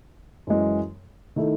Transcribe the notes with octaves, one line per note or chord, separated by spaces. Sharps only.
F#2 E3 G#3
D#3 A3 E4